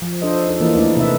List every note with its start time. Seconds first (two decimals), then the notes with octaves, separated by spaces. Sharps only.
0.02 F3
0.22 D4 F4 A4 C5 D#5
0.48 D#4 A4
0.60 E3 A#3 E4 A#4
0.74 A3 D4 D#4 D5
0.97 C3 D#4 A4 B4 E5